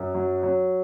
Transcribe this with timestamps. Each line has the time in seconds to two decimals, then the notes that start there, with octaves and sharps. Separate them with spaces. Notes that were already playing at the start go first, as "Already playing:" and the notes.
Already playing: F#2
0.14 F#3
0.43 F#3